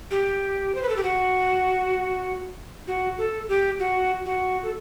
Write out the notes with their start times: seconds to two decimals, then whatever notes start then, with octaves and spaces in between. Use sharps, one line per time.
0.11 G4
0.75 C5
0.83 B4
0.89 A4
0.97 G4
1.03 F#4
2.88 F#4
3.18 A4
3.49 G4
3.79 F#4
4.26 F#4
4.63 A4